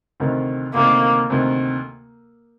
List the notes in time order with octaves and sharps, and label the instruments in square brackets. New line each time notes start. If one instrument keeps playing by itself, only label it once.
[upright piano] D2 C3 D#3
[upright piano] D2 C3 D#3 [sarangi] A#3
[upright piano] D2 C3 D#3